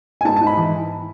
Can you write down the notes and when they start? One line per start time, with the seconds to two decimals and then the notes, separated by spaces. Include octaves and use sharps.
0.21 G#5
0.25 G#2 A5
0.36 A5
0.41 G#2
0.47 B5
0.57 E3